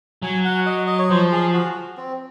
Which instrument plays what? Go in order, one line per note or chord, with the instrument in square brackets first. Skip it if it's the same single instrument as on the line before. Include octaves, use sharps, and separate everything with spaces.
[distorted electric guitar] F#3 [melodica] G#5
[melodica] F#5
D#5
D#5
C#5
[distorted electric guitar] F3 [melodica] C5
[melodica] G#4
F#4
C4